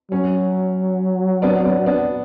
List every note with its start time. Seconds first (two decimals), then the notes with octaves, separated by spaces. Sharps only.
0.11 F#3 C#4
1.42 B3 D4
1.65 B3 D4
1.86 B3 D4